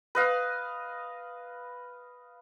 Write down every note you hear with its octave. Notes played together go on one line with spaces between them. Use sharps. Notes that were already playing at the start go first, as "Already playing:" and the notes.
B4 D#5 F5